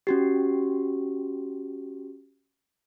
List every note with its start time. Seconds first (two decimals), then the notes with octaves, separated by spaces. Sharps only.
0.07 C#4 F#4 G4